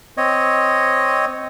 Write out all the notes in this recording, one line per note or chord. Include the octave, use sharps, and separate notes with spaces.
C4 C#5 D#5